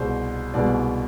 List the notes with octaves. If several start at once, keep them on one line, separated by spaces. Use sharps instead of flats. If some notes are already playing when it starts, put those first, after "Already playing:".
Already playing: C2 B2 G#3 C5
C2 B2 G#3 D5